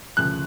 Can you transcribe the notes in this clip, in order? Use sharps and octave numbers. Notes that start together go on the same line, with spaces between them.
D2 C#3 F3 F#6